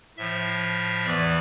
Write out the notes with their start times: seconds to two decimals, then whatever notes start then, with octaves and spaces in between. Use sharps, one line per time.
0.17 A2 F3 E5
1.05 E2 E3 D5